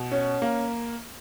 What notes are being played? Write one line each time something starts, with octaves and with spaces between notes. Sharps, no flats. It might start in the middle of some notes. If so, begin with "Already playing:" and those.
Already playing: B2
C#4
A#3